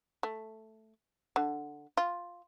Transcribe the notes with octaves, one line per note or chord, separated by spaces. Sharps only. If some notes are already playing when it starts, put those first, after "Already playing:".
A3
D3
F4